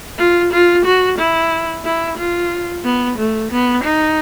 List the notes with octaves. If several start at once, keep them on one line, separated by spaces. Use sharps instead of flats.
F4
F4
F#4
E4
E4
F4
B3
A3
B3
D#4